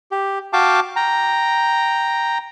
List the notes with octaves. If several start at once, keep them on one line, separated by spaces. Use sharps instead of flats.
G4
F#4 F5 G5 A5 D6
G5 A#5